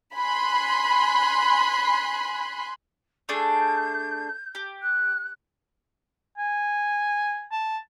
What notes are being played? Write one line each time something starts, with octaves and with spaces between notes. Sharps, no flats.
G#5 B5 C6 F#6
A3 D4 G#4 G6
G4
F#6
G#5
A5